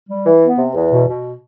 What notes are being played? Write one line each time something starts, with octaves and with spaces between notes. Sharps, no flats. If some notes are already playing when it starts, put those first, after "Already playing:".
G3
E3
B3
C3
E2
B2
B2